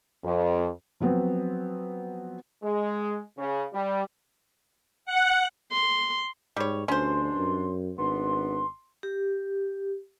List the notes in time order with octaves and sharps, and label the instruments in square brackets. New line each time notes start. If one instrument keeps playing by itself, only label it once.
[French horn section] F2
[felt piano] F3 F#3 B3 C4
[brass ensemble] G#3
C#3
G3
[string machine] F#5
[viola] C6
[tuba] G#2 [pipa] G3 C#5
[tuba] D2 [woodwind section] G2 B2 D4 [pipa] C#4 C5 [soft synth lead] C6
[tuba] F#2
[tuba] G#1 [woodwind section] B3 D4 [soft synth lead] C6
[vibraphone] G4